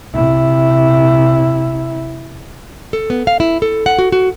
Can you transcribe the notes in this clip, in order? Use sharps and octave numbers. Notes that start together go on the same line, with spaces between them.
C3 E4
A4
B3
F5
E4
A4
F#5
F#4
F#4